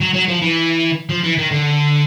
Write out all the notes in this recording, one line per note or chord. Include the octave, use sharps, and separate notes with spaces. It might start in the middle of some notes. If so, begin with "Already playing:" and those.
F#3
F#3
F3
E3
F3
E3
D#3
D3